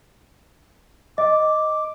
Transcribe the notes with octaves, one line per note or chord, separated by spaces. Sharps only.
D#5 D6